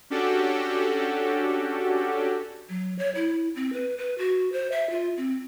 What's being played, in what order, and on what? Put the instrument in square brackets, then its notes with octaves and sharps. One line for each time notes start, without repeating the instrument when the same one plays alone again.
[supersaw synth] C#4 D4 F#4 G4 A4
[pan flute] F#3
C#5
E4
C4
B4
B4
F#4
C5
E5
F4
C4